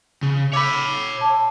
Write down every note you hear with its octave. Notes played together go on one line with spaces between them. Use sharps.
C#3
C#5 B5 D6 E6
A5